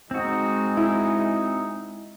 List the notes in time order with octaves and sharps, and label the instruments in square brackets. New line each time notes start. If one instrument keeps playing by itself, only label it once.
[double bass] G#3 [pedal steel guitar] C4 F#4 [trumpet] D#4
[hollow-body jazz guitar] E4